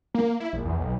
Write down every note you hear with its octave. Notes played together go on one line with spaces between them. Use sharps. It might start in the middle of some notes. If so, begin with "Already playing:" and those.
A#3
E4
A#1
E2
B1